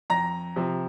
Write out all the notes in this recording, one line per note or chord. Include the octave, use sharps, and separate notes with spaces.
F2 A#5 A#6
C3 F3